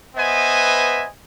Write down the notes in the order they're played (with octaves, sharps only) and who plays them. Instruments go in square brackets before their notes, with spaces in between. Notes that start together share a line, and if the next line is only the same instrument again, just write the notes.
[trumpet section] B3 B4 C5 D#5 E5 G#5